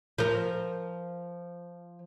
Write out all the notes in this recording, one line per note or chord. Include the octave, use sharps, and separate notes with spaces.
F3 A#4